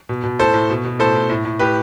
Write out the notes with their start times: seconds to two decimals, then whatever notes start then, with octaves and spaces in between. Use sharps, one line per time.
0.09 B2
0.24 B2
0.39 A2 A4 C5
0.54 A2
0.70 B2
0.85 B2
0.99 A2 A4 C5
1.15 A2
1.30 A2
1.45 A2
1.59 A2 G4 B4